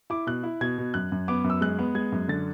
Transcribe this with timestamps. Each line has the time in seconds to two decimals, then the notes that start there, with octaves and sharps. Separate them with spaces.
0.10 E4 D6
0.27 B2 F#6
0.43 E4
0.61 B2 G#6
0.78 B2
0.94 F#2 F#6
1.12 F#2
1.28 B3 D6
1.44 F#2
1.50 E6
1.61 G#3 F#6
1.79 B3
1.95 G#3 G#6
2.12 F#2
2.28 D3 A6